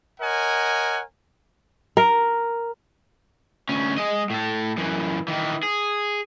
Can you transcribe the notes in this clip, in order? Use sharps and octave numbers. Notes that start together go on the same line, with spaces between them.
A#4 C#5 D#5 F#5 G#5
A#4
D2 C#4
G#3 D#5
A2 A4
F#2 E3
D#3 E3
G#4